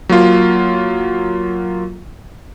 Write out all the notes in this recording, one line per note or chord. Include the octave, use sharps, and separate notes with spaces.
F#3 A#3 F4